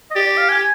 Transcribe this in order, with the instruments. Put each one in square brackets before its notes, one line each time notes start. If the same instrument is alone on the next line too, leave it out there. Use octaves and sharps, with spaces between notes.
[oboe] D#5
[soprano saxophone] G4 [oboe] D5
[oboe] D5
F5
G#5
G#5